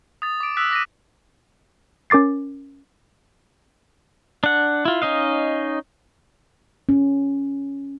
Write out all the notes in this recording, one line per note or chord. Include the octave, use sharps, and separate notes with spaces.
D#6 A6
D6 D7
D#6 E6 F#6 B6
D6 A#6 B6 D#7
C#4 A#4 D6 A6 C7
D4 F#5
E4 F4
C#4 D#4 D#5 F5
C#4